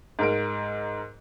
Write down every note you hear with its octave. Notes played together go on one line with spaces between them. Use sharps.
G#2 A#4 D7